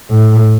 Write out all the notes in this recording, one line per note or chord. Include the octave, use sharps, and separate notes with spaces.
A2